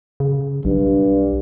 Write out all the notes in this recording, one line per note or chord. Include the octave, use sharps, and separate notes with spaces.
C#3
B1 G2